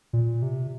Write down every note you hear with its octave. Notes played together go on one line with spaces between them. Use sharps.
A#2
C3